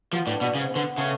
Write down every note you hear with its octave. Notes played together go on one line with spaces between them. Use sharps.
F3 B3
A2 D4
B2 B3
G#2 C#3
B3
D3
B3
C#3 A3